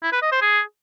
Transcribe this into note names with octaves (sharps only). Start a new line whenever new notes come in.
E4
B4
D#5
C5
G#4